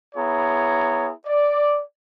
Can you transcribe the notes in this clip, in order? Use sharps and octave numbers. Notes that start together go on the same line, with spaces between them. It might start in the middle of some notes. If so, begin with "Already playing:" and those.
B3 E4 G#4 C#5 A#5
D5